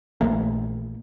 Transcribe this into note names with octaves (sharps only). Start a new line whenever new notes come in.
A#1 E3 A3 A#3